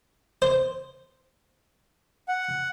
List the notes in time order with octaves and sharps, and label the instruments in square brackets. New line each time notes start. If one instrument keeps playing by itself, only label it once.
[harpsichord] C5
[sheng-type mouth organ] F#5